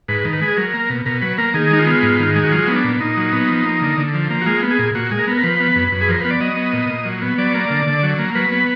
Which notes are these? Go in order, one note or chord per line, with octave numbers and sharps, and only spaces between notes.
G#2 B4
D#3
B4
G#3
G#4
F#3 A#4
A#3
B2
B2 A#4
F#3 B4
A#3 A#4
D#3 G#4
G#3 D#4
F4
B3
G#2
D#3
G#3
F#4
F#3 F4
B3 D#4
D4
A#2
A#2 D#4
F#3
B3
F3
A#3
D3
D3
F3
A#3
F#4
G#3 F4
B3
G#4
A#2
A#2 F#4
G#3
A#4
B3
A#4
F3 B4
B3
F#2
F#2
G#4
F3 A#4
B3 B4
D5
F#3 D#5
B3
A#2
A#2
F#3
B3
F#3 D5
A#3
D3
D3
F#3
A#3
F#3 B4
B3